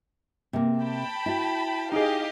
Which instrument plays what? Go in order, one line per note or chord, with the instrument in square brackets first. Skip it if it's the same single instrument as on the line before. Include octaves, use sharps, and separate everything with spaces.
[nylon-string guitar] C3 A#3
[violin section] G5 A5 B5
[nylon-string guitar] E4 F#4
[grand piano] D#4 G#4 [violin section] G4 D#5 F5